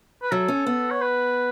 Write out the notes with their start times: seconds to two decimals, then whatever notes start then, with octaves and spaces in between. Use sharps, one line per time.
0.23 B4
0.32 F#3 A4
0.48 C#4
0.67 B3
0.90 C#5
1.02 B4